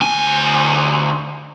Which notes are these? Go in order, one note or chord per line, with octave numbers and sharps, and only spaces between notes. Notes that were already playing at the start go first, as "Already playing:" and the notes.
D2 G#5